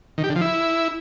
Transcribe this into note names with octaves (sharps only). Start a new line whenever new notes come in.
D#3
G4
D3
F3
E4